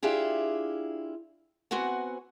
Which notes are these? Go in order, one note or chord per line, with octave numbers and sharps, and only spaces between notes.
D4 E4 F4 G4 G#4
B3 C4 F#4 F#5 G#5